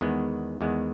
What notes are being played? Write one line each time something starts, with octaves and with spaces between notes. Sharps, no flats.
E2 D#3 G#3 B3
E2 D#3 G#3 B3